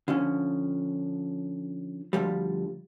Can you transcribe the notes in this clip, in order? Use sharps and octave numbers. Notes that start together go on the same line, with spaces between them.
D3 F3 C#4
D2 G2 F3 G3